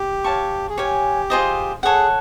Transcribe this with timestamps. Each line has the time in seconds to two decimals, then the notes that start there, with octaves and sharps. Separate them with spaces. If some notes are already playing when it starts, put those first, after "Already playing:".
Already playing: G4
0.24 C#5 F5 A5 C#6
0.69 G#4
0.77 G4 C#5 F5 G#5
1.30 F4 G#4 C5 D#5
1.83 G#4 A4 C#5 F#5